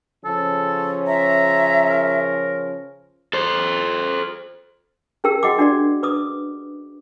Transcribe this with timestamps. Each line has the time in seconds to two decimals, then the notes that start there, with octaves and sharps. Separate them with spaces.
0.25 C#3 F3 C#4 A4
1.07 E5 A#5
1.90 A#4
3.33 A4 C5
5.24 C#4 G4 G#4 A#4 G5 E6
5.43 F#4 D#5 F#5 G5 D6
5.58 D4 F#4 D5
6.03 B4 D6 D#6